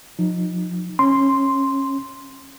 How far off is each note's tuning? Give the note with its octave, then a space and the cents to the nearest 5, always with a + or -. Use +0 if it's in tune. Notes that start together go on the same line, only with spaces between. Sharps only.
F3 +35 D#4 +0
C#4 -20 C6 +0